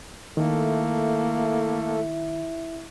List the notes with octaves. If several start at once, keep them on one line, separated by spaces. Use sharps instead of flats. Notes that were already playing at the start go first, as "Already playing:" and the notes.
D#3 A3 A#3 E4 A4